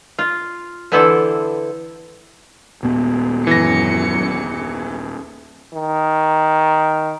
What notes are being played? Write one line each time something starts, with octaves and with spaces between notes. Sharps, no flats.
F4
D3 E3 B3 E4 A4 C5
D#1 A#2 B3
F#2 E3 A#6 C#7
D#3